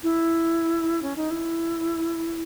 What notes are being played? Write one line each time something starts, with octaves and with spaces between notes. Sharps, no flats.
E4
C#4
D#4
E4